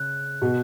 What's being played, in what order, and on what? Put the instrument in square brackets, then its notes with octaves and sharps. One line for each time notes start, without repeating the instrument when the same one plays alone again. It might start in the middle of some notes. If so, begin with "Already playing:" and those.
Already playing: [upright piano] C#3 [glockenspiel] F#6
[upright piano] B2